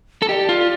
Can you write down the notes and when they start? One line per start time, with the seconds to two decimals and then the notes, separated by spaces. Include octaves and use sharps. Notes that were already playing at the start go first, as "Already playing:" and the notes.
0.22 A4
0.29 G4 D#5
0.32 D5
0.49 F4